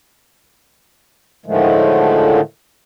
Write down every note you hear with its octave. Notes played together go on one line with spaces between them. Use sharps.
A2 D3 D#3 F3 G#3 A3